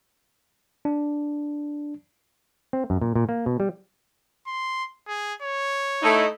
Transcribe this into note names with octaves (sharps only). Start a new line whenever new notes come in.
D4
C4
F#2
A#2
A#2
A#3
B2
G3
C6
G#4
C#5
A3 D#4 E4